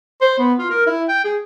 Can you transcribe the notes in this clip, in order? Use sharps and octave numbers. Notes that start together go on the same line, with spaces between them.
C5
B3
F4
A#4
E4
G5
G#4